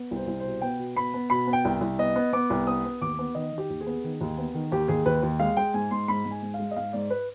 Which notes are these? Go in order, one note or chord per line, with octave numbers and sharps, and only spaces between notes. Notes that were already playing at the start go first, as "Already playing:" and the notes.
Already playing: B3
C2
C5
C2
C5
B2
B3 G5
B2
B3 B5
B3
B2 B5
B3
G5
C2
C2
B3 D#5
B3
B3 D6
C2
B3 D#6
B3
D#2 D6
B3
D#3 D#5
D#3
G4
D#2
G#4
B3
D#3
D#2
B3
D#3
D#2 G4
D#2 G#4
D#2 B4
D#2
G#3 F5
G#3 G5
G#2 G#5
G#2 C6
G#2 B5
G#2
G#5
G#2
F5
G#3
D#5
G#2 F5
G#2 D5
B4